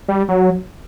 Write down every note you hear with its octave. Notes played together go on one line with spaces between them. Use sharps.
G3
F#3